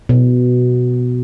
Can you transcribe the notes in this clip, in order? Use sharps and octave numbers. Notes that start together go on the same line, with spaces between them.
B2